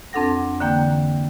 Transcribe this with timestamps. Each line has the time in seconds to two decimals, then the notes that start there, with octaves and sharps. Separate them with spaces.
0.13 F2 C4 D4 A4 F#5 A#6
0.60 D3 E3 A#3 G5 G6